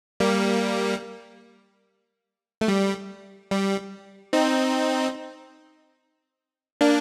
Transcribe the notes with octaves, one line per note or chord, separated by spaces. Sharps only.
G3 A#3
A3
G3
G3
C4 D#4
A#3 D4